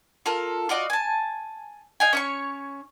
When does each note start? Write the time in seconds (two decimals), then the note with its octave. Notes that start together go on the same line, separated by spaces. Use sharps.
0.26 F4 A4 A#4
0.69 F4 F#4 D5 D#5
0.90 G#5 A5
2.00 D#5 F5 G5 G#5
2.13 C#4 C#5 C#6